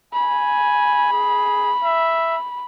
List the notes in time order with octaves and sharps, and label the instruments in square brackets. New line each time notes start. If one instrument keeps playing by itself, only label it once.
[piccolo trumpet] G#5 [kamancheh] B5
[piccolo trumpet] G#4
E5